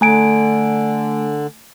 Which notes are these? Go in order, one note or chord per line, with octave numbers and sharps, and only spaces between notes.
D3 A3 G#5 D7